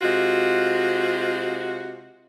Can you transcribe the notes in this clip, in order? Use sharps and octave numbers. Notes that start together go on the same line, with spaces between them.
C3 G#3 F4 F#4